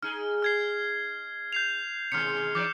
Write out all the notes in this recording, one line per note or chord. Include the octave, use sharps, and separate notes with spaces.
D#4 G#4 F6
F6 G#6 C7
G6 C7 F7
B2 D#3 G#3 F6 C#7
E3 D#4 D5 D6 G6